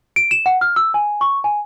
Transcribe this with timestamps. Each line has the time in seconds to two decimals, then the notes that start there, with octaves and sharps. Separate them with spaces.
0.16 D7
0.31 E7
0.46 F#5
0.61 F6
0.76 E6
0.94 G#5
1.21 C#6
1.44 G#5